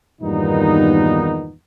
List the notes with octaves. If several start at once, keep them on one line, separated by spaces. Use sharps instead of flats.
E2 G2 A#2 D#3 B3 D#4